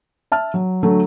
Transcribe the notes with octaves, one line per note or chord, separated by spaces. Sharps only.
E5 A5 F6
F#3
D3 F#3 A3